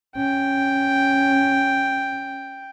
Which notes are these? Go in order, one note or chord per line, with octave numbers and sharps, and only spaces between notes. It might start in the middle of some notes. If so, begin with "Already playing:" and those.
C#4 G5